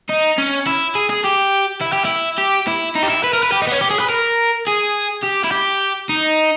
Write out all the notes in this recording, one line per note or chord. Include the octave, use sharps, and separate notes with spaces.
D#4
C#4
E4
G#4
G#4
G4
E4
G4
E4
G4
E4
D#4
G4
E4
B4
A#4
B4
G4
D#4
B3
C#4
G4
G#4
B4
A#4
G#4
G4
E4
G4
D#4